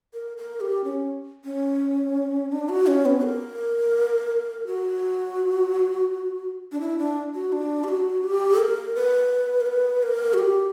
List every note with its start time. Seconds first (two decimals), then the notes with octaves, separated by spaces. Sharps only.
0.14 A#4
0.37 A#4
0.61 G4
0.84 C#4
1.45 C#4
2.52 D4
2.69 F#4
2.87 C#4
3.06 B3
3.24 A#4
4.67 F#4
6.72 D4
6.81 E4
6.99 D4
7.35 F#4
7.52 D4
7.84 G4
7.88 F#4
8.23 G4
8.59 A#4
8.96 B4
9.60 A#4
9.66 B4
10.03 A#4
10.34 F#4
10.38 G4